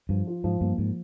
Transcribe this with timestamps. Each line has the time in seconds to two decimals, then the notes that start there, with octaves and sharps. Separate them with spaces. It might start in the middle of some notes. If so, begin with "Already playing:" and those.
0.09 G2 F3
0.27 F4
0.44 G#2 F3
0.61 G2 A#3
0.78 G#2 F3